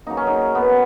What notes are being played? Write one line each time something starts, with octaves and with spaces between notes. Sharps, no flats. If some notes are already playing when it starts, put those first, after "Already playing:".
C#3 F#3 A#3 D#4
C#4
D#4
B3